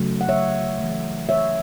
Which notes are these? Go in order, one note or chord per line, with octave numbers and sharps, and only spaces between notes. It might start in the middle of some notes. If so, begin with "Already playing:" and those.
Already playing: C#3 F#3 A3
F#5
C#5 E5
E3 A3
C#5 E5